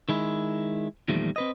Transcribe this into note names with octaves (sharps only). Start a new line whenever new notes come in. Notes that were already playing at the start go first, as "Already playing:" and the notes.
D#3 G#3 E4
E2 A#2 D#3 F3 G3 A3
C4 B4 D#5